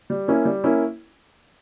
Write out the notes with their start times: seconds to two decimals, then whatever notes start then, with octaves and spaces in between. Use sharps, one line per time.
0.10 G3
0.28 A#3 C#4 E4
0.45 G3
0.64 A#3 C#4 E4